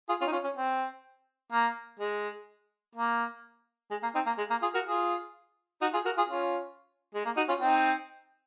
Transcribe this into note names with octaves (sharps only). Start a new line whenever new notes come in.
F4 G#4
C#4 F4
D#4
C#4 F4
C#4
C4
A#3
G#3
A#3
G#3
A#3
C4 D#4
A#3
G#3
A#3
F4 G#4
F#4 A#4
F4 G#4
D#4 F#4
F4 G#4
F#4 A#4
F4 G#4
C#4 F4
G#3
A#3
D#4 F#4
C#4 F4
C4 D#4